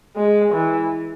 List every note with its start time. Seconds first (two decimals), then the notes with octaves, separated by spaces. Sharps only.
0.16 G#3
0.53 E3